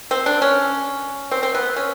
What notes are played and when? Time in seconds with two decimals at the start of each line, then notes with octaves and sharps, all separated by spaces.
0.11 C4
0.26 D4
0.42 C#4
1.31 C4
1.43 C4
1.55 B3
1.76 C#4